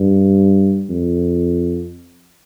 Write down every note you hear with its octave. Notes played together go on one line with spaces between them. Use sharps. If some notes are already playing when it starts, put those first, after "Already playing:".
Already playing: G2
F2